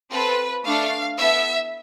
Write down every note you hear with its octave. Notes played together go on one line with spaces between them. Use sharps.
C4 F4 A4 B4
A3 D4 A4 F5
B3 E4 A4 E5